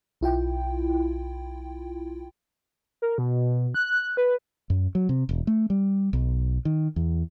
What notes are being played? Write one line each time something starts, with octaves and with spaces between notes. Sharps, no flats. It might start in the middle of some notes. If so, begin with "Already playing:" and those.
B1 E4 F4 G5
A#4
B2
F#6
B4
F#2
F#3
C3
E1
A3
G3
B1
D#3
E2